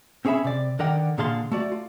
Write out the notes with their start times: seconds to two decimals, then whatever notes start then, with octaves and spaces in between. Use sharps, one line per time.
0.25 C4 C#4 G#4 C#5 E5 B5
0.44 C3 D5
0.79 D3 D#3 A#4 D5 F#5 G5
1.18 A#2 D3 G#4 F5 A5 C6
1.52 A3 F#4 D5
1.72 F4